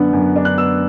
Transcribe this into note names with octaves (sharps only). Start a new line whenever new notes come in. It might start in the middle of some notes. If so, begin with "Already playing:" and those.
Already playing: F#2 D3 B3 D4 F#5
F#2
D4
F#6
B3 E6